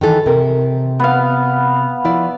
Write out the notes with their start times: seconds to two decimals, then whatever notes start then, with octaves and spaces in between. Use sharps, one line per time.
0.01 D#3 E3 A4
0.26 C3 A#4
0.99 B3 F5
2.04 F3 E4 D5